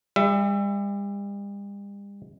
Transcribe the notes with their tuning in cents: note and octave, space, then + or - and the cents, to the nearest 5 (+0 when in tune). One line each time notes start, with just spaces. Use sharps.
G3 +45 E5 +30